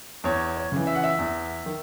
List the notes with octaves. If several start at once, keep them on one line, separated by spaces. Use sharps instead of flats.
E2 C#5
C#5
C#3 E3
E5
F#5
E5
E2
D#3